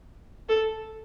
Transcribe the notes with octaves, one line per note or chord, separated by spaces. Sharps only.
A4